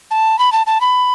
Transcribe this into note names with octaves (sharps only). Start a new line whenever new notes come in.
A5
B5
A5
A5
B5